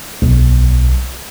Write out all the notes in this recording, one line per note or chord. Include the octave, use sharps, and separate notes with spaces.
B1